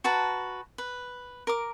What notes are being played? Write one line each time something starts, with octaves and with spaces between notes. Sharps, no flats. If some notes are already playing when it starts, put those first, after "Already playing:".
F#4 B4 A5 A#5
B4
A#4 D6